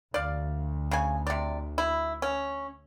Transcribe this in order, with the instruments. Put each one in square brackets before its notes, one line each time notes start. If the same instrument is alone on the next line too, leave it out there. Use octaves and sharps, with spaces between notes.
[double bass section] D2 [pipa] D5 F5
[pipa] C#3 G#5
C3 D5
E4
C#4